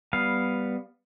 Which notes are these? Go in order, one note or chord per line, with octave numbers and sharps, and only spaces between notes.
G3 B3 F5